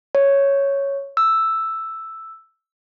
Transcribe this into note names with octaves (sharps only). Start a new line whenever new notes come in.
C#5
E6